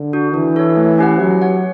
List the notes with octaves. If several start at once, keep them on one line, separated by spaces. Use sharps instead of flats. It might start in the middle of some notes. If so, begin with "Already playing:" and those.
Already playing: D3
D4 F#4
E3 D4
A4 C#5
A3
C#4 G4 B4 F#5
F#3 G4
C#5 F#5